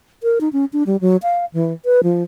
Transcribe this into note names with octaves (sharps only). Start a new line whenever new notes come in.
A#4
D#4
C#4
D4
G3
F#3
F5
E3
B4
F3